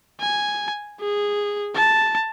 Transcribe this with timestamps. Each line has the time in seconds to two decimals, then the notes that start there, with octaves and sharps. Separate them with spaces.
0.20 G#5
1.00 G#4
1.75 A5